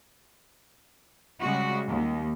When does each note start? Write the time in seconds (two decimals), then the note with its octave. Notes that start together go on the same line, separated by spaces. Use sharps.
1.43 C#3 G3 G#3 F#4
1.87 D#2